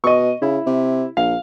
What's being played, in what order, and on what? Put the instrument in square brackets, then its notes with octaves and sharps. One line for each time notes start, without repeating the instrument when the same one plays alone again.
[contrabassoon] B2 [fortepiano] D#5 C#6
[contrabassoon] C#3 [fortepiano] E4
[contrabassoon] C3
[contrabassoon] A#1 [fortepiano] F5